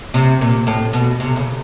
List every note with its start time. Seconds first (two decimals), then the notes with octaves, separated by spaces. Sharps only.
0.14 C3
0.41 A#2
0.67 A2
0.93 B2
1.20 C3
1.36 C#3